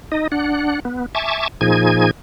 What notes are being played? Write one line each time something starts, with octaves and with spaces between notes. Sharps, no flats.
D#4 D#5
D4 F#5
B3
E5 G#5 A5 C#6 D6
A#2 F3 D#4 G#4 G#5 G#6